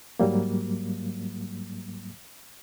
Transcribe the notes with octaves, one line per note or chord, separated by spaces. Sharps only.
G#2 F#3 G3 A#3